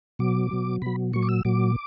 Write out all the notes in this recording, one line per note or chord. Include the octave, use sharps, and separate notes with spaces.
B2 F#3 D6
B2 F#3
B2 F#3 B5
A#2 F#3 C#6
D6
E6
A#2 F#3 D6